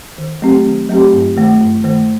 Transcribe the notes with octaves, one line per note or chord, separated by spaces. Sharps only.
D#3
F#3 A3 C4 G4
D#3
F#3 A3 C4 G4
G2
D#3 A3
G2
D#3 A3